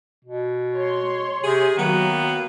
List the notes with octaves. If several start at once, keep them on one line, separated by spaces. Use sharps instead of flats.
B2
C#5 C6
C3 G#4
D#3 F#3 A#3 B3 F#4